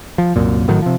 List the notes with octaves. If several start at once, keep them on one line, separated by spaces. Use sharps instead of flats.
F3
C2 F#2 A#2
G#1 A2 D#3 F#3
C3 F3